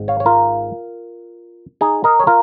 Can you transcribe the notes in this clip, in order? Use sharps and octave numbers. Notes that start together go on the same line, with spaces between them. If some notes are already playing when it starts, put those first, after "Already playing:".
Already playing: G#1 G#2 G#3
C#5 F5
C#5
F4 A#4
D#4 G#4
A#4 D#5
C#5
F4 A#4